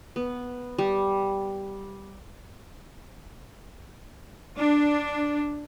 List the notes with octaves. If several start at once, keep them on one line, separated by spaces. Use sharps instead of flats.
B3
G3
D4